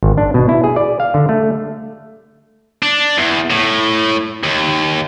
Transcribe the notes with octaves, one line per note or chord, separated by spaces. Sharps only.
G#1
D4
B2
E4
G#4
D5
F5
D3
A3
D4
E2
A2
D#2